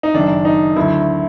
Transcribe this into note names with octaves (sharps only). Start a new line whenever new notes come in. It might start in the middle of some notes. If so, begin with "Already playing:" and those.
D#4
F#1 F#2 D#3 D4
D#4
D2 D3 F#3 E4